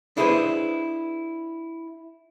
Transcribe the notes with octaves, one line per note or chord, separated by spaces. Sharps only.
D4 E4 G#4 A4 B4 C5